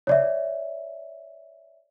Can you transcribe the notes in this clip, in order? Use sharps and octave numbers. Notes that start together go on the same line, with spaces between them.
C#5 D5 E5